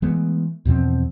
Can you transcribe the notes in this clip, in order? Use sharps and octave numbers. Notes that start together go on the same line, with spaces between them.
E3 G#3 A3 B3
E2 B2 F3 C4